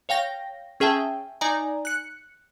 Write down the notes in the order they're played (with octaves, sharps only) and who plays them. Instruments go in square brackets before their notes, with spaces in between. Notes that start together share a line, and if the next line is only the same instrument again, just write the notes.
[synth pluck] C#5 F5 G5 A#6
C#4 G#4 E5 G5 A5
D#4 D5 G#5 A#5
F#6 C#7